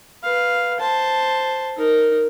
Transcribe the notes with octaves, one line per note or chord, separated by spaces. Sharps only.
B4 F5
C5 A5
D#4 A#4